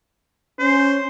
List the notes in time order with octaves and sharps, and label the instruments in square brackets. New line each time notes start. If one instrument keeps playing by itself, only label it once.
[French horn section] C#4 [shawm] C5